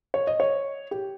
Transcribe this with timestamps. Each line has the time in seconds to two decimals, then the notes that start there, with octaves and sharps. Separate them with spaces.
0.14 C#5
0.27 D#5
0.40 C#5
0.91 G4